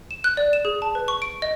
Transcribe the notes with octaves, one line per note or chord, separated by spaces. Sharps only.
E7
F#6
D5
E7
G#4
A5
B4
C#6
D7
D#5